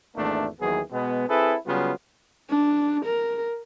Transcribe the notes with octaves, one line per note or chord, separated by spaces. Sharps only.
G#1 E2 A3 A#3 D4
D#2 E3 F#3 B3 G#4
B2 G#3 B3
C4 E4 G#4 A4 B4
C#3 F#3 G3 B3 F4
D4
A#4